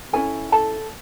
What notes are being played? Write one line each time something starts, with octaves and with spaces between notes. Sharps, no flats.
C#4 E4 G#4 A4 G#5
A4 A5